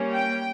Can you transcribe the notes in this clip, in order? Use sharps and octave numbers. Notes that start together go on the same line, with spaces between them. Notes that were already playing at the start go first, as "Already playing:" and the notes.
Already playing: G3 A#3 C#4
G5